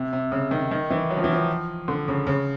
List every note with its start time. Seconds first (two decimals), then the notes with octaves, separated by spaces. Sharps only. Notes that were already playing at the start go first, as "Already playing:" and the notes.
Already playing: C3
0.13 C3
0.32 C#3
0.51 D#3
0.71 D#3
0.90 E3
1.10 F#3
1.17 F3
1.24 E3
1.32 F3
1.88 D3
2.08 C#3
2.27 C#3